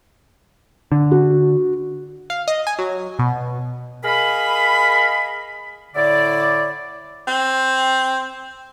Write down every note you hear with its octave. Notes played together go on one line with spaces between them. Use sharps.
D3
F#4
F5
D#5
G#5
F#3
B2
G#4 A#4 D#5 F5 B5
A2 D3 E4 D5
C4